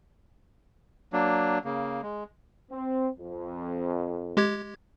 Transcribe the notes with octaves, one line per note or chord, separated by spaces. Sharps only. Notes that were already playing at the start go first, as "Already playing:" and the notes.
F#3 A#3 D4
C#3 A#3
G#3
C4
F2
G#3 G4 G#6